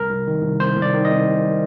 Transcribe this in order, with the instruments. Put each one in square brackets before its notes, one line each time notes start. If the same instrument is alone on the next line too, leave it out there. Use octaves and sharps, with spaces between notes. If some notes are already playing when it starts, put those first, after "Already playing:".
Already playing: [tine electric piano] C2 A#4
C2
D#3
C2
C2 C5
C2 D5
D#3
D#5
C2
C3